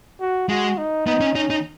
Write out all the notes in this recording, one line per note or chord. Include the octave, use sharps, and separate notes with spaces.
F#4
G#3 F#4
D#4
B3 D#4
C#4
C#4 D#4
D#4